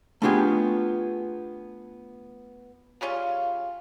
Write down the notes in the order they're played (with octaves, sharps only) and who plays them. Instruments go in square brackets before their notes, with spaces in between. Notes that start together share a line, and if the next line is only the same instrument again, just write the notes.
[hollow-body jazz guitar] A3 B3 D4 F4 G4 G#4
[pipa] C#3 G3 C#4 F4